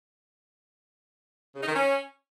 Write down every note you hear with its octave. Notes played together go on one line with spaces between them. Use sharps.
C#3
D#4
D#3
C#4